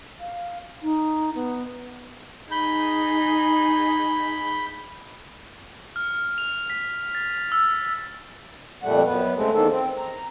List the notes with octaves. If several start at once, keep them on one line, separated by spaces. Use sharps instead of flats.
F5
D#4
B3
D#4 G#4 B5 G6
F6
F7
B6
A6
E6
F2 A#2 G3 A3 F#5
F#2 B3 B4
C#3 G#3 A3 C4
E2 D#3 A#3 A4
C4
A#5